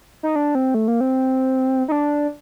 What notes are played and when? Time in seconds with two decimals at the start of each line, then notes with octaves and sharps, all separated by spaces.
0.23 D#4
0.36 D4
0.55 C4
0.74 A3
0.88 A#3
1.01 C4
1.88 D#4
1.92 D4